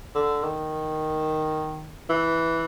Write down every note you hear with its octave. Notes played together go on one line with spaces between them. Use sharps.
D3
D#3
E3